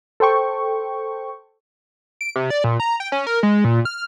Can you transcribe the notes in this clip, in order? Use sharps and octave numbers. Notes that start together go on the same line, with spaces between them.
A4 C5 G5 C#6
D7
C3
D5
A#2
A#5
G5
C#4
A#4
G#3
A#2
F6